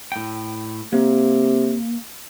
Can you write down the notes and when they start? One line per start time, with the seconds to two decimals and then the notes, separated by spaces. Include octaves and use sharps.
0.12 A2 G5
0.93 C3 A#3